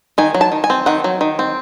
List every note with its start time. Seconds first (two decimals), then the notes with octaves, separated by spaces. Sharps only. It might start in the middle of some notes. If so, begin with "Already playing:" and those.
0.18 D#3 G#5
0.35 F#3
0.41 A5
0.52 D#3
0.64 G#5
0.70 C4
0.86 D#3 F#5
1.04 F#3
1.21 D#3
1.39 C4